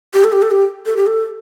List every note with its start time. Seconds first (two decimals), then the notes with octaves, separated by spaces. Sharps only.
0.14 G4
0.24 A4
0.32 G4
0.42 A4
0.51 G4
0.86 A4
0.97 G4
1.07 A4